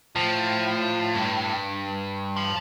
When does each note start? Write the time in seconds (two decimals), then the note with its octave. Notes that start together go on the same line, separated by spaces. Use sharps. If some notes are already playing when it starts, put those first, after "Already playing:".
0.16 A2 F3
1.15 G2
2.37 A5 C6